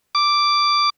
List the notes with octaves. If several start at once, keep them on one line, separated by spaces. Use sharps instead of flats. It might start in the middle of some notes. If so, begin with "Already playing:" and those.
D6